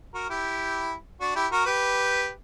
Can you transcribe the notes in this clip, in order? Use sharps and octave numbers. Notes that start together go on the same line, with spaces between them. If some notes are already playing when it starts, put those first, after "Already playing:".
F#4 A#4
E4 G4
D4 F#4
E4 G4
F#4 A#4
G4 B4